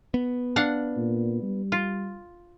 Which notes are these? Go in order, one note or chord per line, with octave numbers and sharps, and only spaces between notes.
B3
D4 F5 F#5
A#2
G3
F4